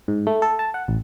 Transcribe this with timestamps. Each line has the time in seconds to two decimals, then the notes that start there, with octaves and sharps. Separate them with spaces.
0.08 G#2
0.27 A3
0.42 A4
0.59 A5
0.74 F#5
0.88 A1